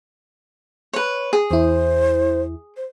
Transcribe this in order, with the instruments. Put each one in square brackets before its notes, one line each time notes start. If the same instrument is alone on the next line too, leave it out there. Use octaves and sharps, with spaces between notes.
[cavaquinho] B4 C#5
G#4
[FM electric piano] E2 E4 [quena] C5
[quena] C5